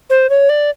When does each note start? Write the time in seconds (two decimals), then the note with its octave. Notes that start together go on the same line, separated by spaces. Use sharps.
0.10 C5
0.29 C#5
0.49 D5